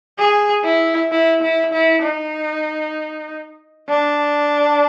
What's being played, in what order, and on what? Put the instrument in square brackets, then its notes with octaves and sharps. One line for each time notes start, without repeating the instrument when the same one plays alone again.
[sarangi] G#4
E4
E4
E4
E4
D#4
D4